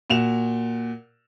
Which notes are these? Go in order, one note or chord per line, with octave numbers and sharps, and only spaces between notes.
A#2 F#4 E7 F7